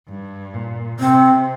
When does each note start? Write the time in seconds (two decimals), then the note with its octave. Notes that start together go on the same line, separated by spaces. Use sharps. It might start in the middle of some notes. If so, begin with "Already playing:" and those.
0.09 G2
0.54 A#2
1.00 C3 C4